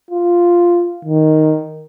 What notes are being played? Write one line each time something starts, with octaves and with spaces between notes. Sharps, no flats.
F4
D#3